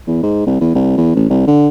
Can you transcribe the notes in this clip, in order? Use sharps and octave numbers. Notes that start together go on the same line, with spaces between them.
E2
G#2
C2
E2
C2
E2
A1
C2
D3